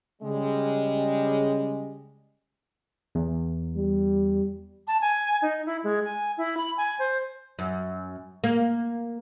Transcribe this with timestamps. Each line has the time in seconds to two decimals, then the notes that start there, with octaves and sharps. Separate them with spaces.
0.22 C#3 G3 G#3
3.15 E2
3.77 G3
4.87 A5
5.01 G#5
5.42 D#4
5.66 E4
5.84 G#3
6.05 G#5
6.38 E4
6.57 B5
6.77 G#5
6.99 C5
7.59 F#2
8.44 A#3